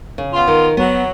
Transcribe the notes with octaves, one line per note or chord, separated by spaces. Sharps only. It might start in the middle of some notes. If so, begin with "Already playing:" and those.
C#3
B3 F4
D#3
F#3 B3